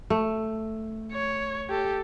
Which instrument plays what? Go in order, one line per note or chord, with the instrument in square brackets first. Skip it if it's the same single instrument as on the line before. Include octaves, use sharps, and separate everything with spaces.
[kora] A3
[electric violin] C#5
G4 A4